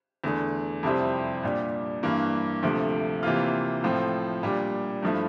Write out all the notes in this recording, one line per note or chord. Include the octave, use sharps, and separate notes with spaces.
E2 D3 A3
F2 C3 G3 C4 E4
A#2 G3 D4 G4
G2 E3 A#3
D2 C3 F3 A3
C3 E3 A#3 F4
A2 F3 C4 F4
A#2 G3 D4
G2 F3 A3 E4